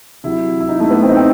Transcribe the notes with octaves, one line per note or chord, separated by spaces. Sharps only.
C3 F#3 E4
E4
D#4
A3
B3
C4
D#4
C4